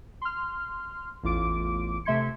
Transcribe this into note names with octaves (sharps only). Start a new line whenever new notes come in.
C6 F6
A1 E2 F4 D6 D7
C3 A3 E5 C6 G#6 C#7